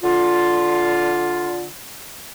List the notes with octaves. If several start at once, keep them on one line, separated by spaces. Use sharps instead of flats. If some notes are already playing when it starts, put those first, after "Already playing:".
D3 F4